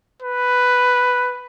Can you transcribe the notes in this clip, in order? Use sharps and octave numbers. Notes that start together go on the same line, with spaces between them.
B4